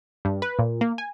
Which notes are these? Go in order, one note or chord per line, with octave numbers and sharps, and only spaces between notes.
G2
B4
A#2
A#3
G#5